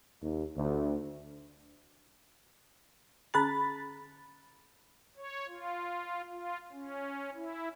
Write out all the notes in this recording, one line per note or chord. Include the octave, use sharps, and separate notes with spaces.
D#2
D2
D3 C#4 A#5 B5 A6
C#5
F4
F4
C#4
E4